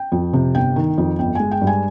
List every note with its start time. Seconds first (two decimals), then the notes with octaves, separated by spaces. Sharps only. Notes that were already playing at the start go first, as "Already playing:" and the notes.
Already playing: G5
0.12 F2
0.33 C3
0.55 G1 G5
0.76 D#3
0.98 F2
1.19 G1 G5
1.35 G#3 G#5
1.51 G5
1.61 G2
1.67 G#5